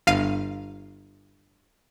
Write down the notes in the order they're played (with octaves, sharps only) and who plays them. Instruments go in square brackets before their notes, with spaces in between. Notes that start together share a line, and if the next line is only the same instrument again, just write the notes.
[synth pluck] G1 F5 D#7